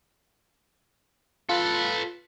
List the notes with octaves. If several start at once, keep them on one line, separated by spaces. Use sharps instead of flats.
F4 A4 B4